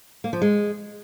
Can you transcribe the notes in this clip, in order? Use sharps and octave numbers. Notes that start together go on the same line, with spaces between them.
A#3
F3
G#3